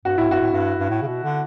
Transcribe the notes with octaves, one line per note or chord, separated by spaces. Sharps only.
G2 F#4
A2 E4
G2 F#4
A2
G2
G2
A2
C#3
B2
D3